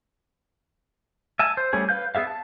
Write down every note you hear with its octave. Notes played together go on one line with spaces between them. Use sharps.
E5 G#5 A5
C5
G3 A3 C#4 G#4
B4 F5 G6
B3 G#4 E5 F5
A5